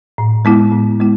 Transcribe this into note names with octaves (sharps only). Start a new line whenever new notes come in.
A2
G#3 B3 E4
A2
G#3 B3 E4